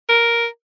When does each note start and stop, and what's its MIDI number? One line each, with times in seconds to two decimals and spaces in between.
0.09 0.46 70